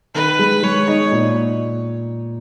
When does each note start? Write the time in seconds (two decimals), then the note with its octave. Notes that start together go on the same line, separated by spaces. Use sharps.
0.14 D#3 B4
0.39 G#3
0.63 G#3 C#5
0.87 D#4
1.12 A#2